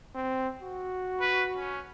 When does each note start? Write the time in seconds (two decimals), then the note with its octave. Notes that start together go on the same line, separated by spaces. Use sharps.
0.15 C4
0.62 F#4
1.21 B4
1.57 C#4